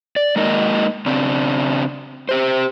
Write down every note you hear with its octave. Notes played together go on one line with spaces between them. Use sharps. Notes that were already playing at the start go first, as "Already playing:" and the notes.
D5
G#3 A#3 D#4 A#4 D#5
C#3 C4 D4
G4 C5